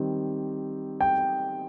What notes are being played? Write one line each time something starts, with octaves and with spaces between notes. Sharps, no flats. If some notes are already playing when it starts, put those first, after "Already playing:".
Already playing: D#3 G3 C4
G5